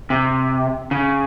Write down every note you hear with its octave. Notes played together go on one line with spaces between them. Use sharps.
C3
C#3